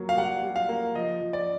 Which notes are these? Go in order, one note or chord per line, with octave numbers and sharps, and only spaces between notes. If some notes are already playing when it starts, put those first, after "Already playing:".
Already playing: F#3 A#3
F5
G3 F#5
G3
F5
A#3
F3 D#5
F3
D5